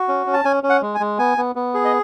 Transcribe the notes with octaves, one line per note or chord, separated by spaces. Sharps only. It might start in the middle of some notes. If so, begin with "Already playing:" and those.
Already playing: F#4
C#4
C#4
A5
C#4 G#5
C#4
F#5
G#3
G#5
G#3
B3 G#5
B3
B3
G#4
D#5